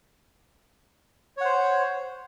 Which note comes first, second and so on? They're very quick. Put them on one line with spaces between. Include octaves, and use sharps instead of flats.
C#5 F#5 C5